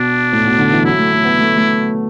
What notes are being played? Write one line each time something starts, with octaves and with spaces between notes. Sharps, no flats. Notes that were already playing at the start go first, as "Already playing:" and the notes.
Already playing: B2 D4
A2
B2
D3
E3
F#3 E4
A3
A3
B3
A3
A3